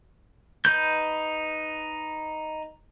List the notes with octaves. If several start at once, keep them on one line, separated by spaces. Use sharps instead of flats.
D#4 B4 G6